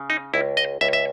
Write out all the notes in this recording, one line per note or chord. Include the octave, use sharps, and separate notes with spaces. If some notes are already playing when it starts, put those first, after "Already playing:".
Already playing: C#3
D#4
C#2 E4
D#5
C#2 E5
E5